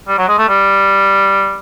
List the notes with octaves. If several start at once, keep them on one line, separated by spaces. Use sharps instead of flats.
G3
F#3
G#3
A3
G3